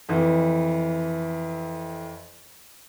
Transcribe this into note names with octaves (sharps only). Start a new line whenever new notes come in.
F2 E3